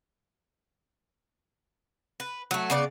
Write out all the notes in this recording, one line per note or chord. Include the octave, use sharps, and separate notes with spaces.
B4
F#3 A3
C#3 B3 D5